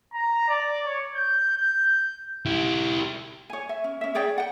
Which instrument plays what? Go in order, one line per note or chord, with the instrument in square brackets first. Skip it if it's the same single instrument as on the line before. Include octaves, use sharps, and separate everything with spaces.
[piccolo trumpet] A#5
D5
C#5
G6
G6
[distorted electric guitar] E4 G4
[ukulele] C#5 G#5
E5
C#4
C#4 E5
G#4 C#5 D5 G5
F#5 G5